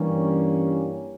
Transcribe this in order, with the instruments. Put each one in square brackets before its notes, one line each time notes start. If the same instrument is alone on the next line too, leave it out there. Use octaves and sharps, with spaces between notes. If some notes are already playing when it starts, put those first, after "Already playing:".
Already playing: [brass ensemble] G2 E3 G3 A#3 C#4